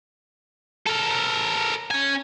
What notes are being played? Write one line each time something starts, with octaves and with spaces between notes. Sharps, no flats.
A4 A#4
C#4 G#5